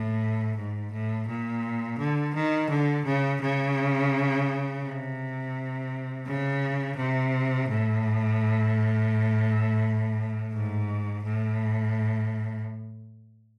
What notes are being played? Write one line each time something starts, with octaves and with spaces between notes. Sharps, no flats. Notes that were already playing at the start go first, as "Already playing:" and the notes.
Already playing: A2
G#2
A2
A#2
D3
D#3
D3
C#3
C#3
C3
C#3
C3
A2
G#2
A2